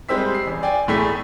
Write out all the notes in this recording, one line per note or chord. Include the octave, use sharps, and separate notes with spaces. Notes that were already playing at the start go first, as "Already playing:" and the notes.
G3 G#3 C4 E6 B6
C7
A1
D5 G5 G#5
E1 A2 A3 G#4 B6